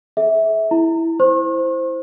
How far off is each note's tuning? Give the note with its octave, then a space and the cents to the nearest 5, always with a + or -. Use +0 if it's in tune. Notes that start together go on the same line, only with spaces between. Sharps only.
G#4 +45 E5 -20
E4 +0 A#5 -30
E4 +0 C5 +0 C#6 -45